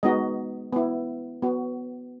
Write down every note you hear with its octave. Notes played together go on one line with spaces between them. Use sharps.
G#3 B3 D#4 F#4 D#5
B3 E4
B3 F#4